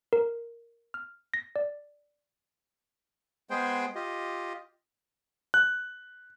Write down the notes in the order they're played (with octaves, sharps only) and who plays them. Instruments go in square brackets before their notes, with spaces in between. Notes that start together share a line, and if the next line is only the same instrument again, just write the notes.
[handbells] A#4
F6
A#6
D5
[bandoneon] G#3 B3 G#4 C5 G5
F4 G4 D#5
[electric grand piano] F#6